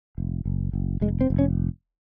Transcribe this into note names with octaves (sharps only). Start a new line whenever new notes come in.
F1
F#1
F#1
F1 G#3
C4
F1
C#4